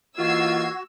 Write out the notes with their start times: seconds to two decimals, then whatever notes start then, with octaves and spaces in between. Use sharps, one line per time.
0.18 E3 A#3 F4 F#4 D#5 E6 G#6 C7